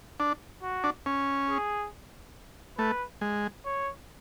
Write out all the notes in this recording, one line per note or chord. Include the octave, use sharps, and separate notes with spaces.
D4
F#4
D4
C#4
G#4
A3 B4
G#3
C#5